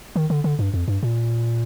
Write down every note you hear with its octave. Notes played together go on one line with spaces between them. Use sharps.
D#3
D3
D3
G2
F2
G2
A#2